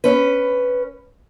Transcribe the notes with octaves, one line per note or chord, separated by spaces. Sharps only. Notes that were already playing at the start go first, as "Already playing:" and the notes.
C#4 B4